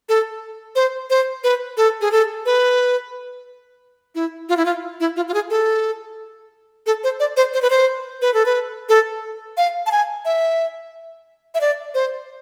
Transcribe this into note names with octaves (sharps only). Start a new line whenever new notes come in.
A4
C5
C5
B4
A4
G#4
A4
B4
E4
F4
E4
F4
E4
F4
F4
G#4
A4
A4
C5
D5
C5
C5
B4
C5
B4
A4
B4
A4
F5
A5
G#5
E5
E5
D5
C5